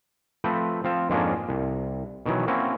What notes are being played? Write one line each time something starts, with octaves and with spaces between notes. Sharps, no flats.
F3 A3 C4 B4 C5
F3 C4 F5 A5
F2 G#2 G#3 A#3 C#4 D4
C2
B2 D#3 E3 F#3
A#3 C4 C#4 E4 F#4